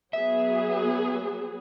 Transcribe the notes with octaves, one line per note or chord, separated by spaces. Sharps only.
F#3 B3 G#4 E5